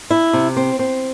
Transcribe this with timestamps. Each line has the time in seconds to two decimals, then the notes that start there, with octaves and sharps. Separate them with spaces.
0.11 E4
0.33 C3
0.57 C4
0.79 C4